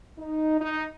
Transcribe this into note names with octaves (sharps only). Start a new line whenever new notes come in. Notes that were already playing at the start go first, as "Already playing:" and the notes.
D#4
D#4